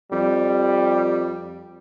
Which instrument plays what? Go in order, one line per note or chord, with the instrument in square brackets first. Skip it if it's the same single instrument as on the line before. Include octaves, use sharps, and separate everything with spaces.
[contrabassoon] F2 [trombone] G3